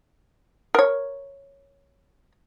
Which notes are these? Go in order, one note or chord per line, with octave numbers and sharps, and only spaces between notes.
A#4 C#5